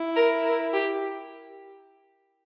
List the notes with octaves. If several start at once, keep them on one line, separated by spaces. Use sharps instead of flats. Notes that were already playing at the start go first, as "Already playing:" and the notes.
Already playing: E4
A#4
A#4
G4